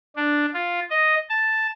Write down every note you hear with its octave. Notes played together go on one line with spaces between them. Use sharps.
D4
F4
D#5
A5